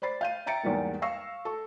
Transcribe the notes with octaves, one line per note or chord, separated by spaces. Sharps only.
C5 D5 B5 A6 C7
F5 G6 D#7
E5 G5 A#5 A6 C#7 D7
E2 G#2 G3 A#3
F5 C#6 E6 A#6 C7
A4 C#6